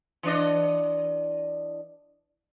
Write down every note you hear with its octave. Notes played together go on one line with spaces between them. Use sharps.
E3 D4 D#5